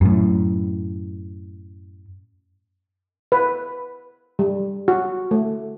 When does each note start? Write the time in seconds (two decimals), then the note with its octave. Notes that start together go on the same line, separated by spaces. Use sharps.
0.01 F#2 A2
3.32 B4
4.39 G3
4.88 F#4
5.31 A3